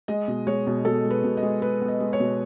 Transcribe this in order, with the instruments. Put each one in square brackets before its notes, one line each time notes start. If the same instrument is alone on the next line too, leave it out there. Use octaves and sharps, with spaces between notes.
[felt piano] G#3 D#5
B2
G#3 C#5
B2
B2 A4
G#3
B4
B2
D#5
G#3
G#3 B4
B3
D#5
G#3
C#5
B2